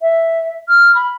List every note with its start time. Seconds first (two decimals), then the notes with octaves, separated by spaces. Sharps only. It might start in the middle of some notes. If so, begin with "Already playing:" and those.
0.02 E5
0.68 F6
0.95 B5